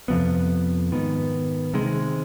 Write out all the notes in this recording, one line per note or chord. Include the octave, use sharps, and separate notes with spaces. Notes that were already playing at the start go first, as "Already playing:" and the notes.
F2 C3 F3 B3
G#2 D#3 B3
C3 D#3 G#3